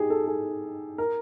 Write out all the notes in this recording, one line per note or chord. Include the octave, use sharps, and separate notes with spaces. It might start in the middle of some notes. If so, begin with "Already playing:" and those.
Already playing: D#4 G4 G#4
A4
G#4
A#4